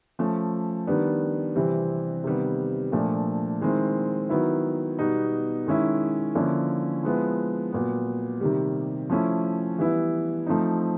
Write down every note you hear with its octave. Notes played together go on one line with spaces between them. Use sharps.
F3 A3 C#4
D#3 G3 B3 D4
C3 E3 G3 C4
C3 D#3 G3 B3
A#2 F3 A3 D4
D#3 G#3 C4 E4
D#3 F#3 B3 E4
B2 G3 B3 D#4
D#3 G#3 C#4 E4
D3 F3 A#3 C#4 E4
F3 G#3 B3 E4
A#2 F#3 B3
C3 D#3 G3
F3 A3 C#4 E4
E3 G3 B3 E4
F3 A3 C4 D#4